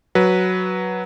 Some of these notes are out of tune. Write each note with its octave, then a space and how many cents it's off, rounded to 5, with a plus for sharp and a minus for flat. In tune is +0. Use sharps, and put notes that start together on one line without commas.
F#3 +0 B4 -10